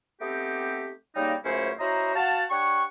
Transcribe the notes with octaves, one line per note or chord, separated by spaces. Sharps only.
A3 B3 C4 D#4 G4
C#3 G3 A#3 D#4
C#2 F#2 A3 C#4 E4 C5
C#4 E4 F#4 C5 D#5 A#5
F#4 F5 F#5 A5
D4 G4 C#5 F#5 C#6